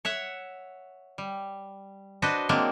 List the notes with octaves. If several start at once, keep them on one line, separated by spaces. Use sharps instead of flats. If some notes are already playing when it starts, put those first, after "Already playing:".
C#5 E5 F#5
G3
D4 F#4 B4 C5 D#5
F#3 G#3 A#3 C4 D4